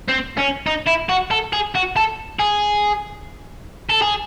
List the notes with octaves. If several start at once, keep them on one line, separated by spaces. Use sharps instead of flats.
C4
C#4
D#4
E4
F#4
A4
G#4
F#4
A4
G#4
A4
G#4